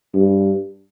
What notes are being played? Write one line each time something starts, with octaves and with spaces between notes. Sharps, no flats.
G2